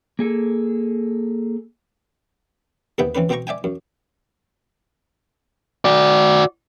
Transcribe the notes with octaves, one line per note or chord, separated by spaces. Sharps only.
A#3 G#4 A4
D#2 C3 B3 B4 E5 G5
E3 C4 C#4 B4
B2 C4 C5 G5 A#5 C#6
D5 E5 G5 G#5
F#2
F#4 D5